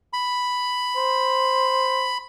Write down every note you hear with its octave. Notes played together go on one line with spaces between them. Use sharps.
B5
C5